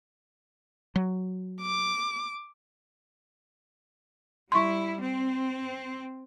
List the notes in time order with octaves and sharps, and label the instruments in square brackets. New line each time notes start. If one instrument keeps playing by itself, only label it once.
[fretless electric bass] F#3
[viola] D6
[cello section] G3 E4 [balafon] C6 C#6
[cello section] C4